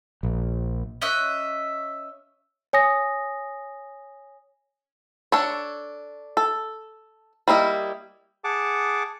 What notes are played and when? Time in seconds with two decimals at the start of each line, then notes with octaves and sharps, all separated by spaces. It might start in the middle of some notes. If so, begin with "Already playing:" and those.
0.23 A#1
1.02 C#4 D#5 E5 F#6
2.73 C#5 G#5 D#6 A#6
5.32 D4 A4 C#5
6.37 A4
7.48 G3 A#3 E4 D#5
8.44 G#4 F#5 A5 D6